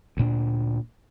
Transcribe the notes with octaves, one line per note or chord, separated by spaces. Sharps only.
D2 A#2 D4